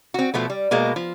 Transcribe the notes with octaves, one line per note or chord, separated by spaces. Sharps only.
C4 F#4
B2 F3 A3 B3
G3
B2 G#3 A#3
F3